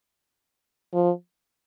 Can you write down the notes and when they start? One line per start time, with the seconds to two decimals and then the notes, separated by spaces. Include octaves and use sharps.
0.94 F3